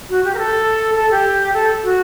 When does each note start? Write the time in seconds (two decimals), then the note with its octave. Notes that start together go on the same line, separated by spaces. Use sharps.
0.10 F#4
0.24 G4
0.35 A#4
0.38 A4
0.96 A4
1.11 G4
1.54 A4
1.84 F#4